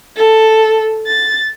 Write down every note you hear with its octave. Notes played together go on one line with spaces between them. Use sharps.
A4
A6